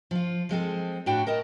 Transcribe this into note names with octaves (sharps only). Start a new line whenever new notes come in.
F3 F4
F3 G#3 C4 A4
A2 D4 F#4 G5
A#4 D#5 A5